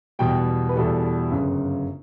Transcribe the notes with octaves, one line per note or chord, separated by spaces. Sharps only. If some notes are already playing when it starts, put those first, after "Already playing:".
E2 B2 G3 G5
B4
E2 B2 G3 A4
G1 F#2 C#3